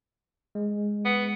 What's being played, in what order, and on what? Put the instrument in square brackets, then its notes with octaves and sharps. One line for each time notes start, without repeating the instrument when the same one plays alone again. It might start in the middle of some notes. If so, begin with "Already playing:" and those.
[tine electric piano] G#3
[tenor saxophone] B3